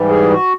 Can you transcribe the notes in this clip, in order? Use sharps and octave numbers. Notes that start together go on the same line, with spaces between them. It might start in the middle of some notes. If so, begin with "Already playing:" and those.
Already playing: G#2 E3 G3
G#4
F#4